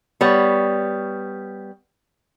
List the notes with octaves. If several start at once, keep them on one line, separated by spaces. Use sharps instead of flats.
G3 B3 C#5